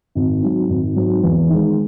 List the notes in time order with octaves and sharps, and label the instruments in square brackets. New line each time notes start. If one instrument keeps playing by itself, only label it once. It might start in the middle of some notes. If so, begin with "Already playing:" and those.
[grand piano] G#1
G#2 F#3
G#1
G#2 F#3
E2
D#3 G#3